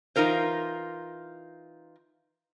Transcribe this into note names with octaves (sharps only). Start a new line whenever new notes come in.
E3 D#4 F4 A#4 C5